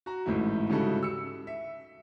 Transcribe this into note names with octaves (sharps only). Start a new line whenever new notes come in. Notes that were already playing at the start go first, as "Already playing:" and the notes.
F#4 A#5
A1 G#2 A3 E4
G#2 C#3 G3 E4 F#4 A4
E6 C#7
E5